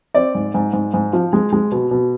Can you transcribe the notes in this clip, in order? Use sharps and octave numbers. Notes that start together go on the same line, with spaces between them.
C4 D5
G#2
G#2
G#2
G#2
F3
G#3
G#3
B2
B2